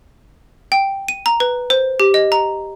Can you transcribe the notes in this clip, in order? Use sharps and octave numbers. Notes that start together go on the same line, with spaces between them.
G5
D#7
A#5
B4
C5
G4
D#5
A#5